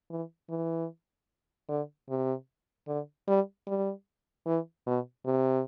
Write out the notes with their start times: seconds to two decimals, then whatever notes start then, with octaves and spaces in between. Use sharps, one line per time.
0.10 E3
0.50 E3
1.69 D3
2.09 C3
2.87 D3
3.27 G3
3.67 G3
4.46 E3
4.86 B2
5.26 C3